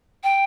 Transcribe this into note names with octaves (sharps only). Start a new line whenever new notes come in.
G5